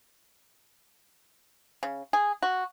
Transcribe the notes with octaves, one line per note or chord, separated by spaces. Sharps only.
C#3
G#4
F#4